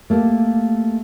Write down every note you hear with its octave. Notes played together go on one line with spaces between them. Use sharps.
A3 A#3 G4